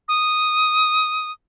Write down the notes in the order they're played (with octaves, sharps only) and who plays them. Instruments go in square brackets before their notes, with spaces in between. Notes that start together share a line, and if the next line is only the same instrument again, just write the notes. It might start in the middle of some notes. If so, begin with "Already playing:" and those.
[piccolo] D#6